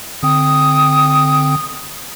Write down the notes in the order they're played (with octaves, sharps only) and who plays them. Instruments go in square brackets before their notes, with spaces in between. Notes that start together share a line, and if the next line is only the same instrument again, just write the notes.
[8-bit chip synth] D3 C4 G5 [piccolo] D#6